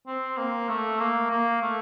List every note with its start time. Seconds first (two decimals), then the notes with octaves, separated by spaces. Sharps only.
0.07 C4
0.37 A#3
0.69 A3
0.99 A#3
1.31 A#3
1.62 A3